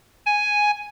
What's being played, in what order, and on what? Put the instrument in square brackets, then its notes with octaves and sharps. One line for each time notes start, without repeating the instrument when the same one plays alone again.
[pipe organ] G#5